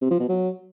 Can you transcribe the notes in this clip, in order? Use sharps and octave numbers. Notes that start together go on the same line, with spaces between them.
C3
F3
B2
F#3